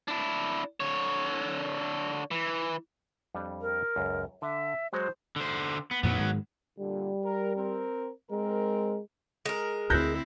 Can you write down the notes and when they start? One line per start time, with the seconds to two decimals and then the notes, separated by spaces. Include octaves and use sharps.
0.08 D4 E4
0.80 D3 C#5
2.31 E3
3.35 F2 G3 D4
3.61 A#4
3.96 C#2 F#2
4.42 D3 E5
4.93 F#3 G#3 F#4 C5
5.36 D3 C5
5.91 B3
6.03 F2 A#2 F3 F#3 B3
6.19 G#2 D#3 G#3
6.79 A#2 D3 G3
7.24 A#4
7.56 C4 A#4
8.31 G#2 G#3 C4 A#4
9.45 G#3 A#4
9.90 D2 D3 C4 E4 F#6 G6 A#6